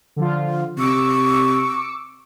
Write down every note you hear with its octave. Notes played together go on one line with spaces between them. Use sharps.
D3 F3 F4
C3 C#6 D6 E6 C#7